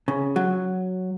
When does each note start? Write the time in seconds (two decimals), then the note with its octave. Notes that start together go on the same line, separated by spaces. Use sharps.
0.08 C#3
0.36 F#3